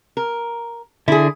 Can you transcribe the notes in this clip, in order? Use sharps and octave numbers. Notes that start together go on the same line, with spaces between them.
A#4
D3 E4 G#4